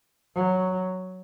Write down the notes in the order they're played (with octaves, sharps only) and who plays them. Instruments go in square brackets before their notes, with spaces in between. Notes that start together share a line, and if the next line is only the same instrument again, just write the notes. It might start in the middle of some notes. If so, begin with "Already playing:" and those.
[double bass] F#3